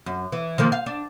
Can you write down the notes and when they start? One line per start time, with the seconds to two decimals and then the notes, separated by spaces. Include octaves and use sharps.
0.06 F#2
0.32 E3
0.58 D#3 F3 A#3
0.72 F5
0.86 D4